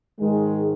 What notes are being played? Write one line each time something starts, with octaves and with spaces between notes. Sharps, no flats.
G#2 D#3 G#3